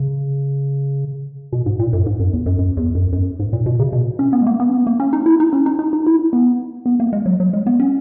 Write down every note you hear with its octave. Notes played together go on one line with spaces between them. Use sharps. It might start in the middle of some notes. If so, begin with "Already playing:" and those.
Already playing: C#3
B2
G#2
A#2
F#2
G#2
F#2
E2
F#2
F#2
E2
F#2
F#2
G#2
A#2
B2
C#3
B2
C#4
B3
G#3
A#3
B3
C#4
B3
A#3
C#4
D#4
E4
D#4
C#4
D#4
D#4
D#4
E4
B3
B3
A#3
G#3
F#3
F#3
G#3
B3
C#4